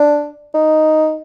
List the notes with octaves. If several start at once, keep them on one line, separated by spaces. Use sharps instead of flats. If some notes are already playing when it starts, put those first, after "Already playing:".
Already playing: D4
D#4